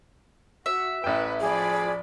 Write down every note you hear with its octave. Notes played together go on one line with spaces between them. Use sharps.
F#4 E5
A1 B4 G5
F3 G#4 D5 B5